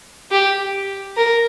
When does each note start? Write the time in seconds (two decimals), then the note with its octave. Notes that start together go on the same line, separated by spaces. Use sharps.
0.31 G4
1.17 A#4